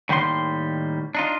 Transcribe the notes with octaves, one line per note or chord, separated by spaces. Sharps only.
A2 D#3 G3 A#3 F5 C6
D4 D#4 F4